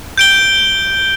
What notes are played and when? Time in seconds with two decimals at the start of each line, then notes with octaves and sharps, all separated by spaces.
0.18 G6 D7 G7